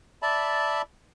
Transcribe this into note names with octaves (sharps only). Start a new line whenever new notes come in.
D5 E5 A5 B5